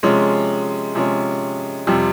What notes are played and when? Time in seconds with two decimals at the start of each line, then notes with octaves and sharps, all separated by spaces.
0.03 C3 F3 G#3 C#4
0.95 C3 F3 G#3 C#4
1.87 F2 C3 G3